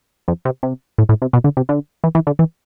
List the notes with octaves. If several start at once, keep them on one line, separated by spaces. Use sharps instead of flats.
F2
C3
C3
A2
A2
C3
B2
D3
C3
D3
E3
E3
D3
E3